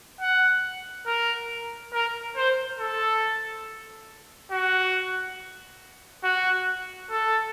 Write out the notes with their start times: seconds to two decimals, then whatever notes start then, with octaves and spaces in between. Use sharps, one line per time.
0.21 F#5
1.06 A#4
1.93 A#4
2.36 C5
2.79 A4
4.52 F#4
6.24 F#4
7.11 A4